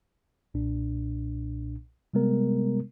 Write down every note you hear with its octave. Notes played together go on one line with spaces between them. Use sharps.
B1 A#2 D4
C3 G3 G#3 B3 A#4